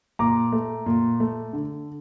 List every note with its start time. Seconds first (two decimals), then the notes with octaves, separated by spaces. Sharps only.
0.19 A#2 A#5 D6
0.52 A3
0.86 A#2
1.20 A3
1.53 D3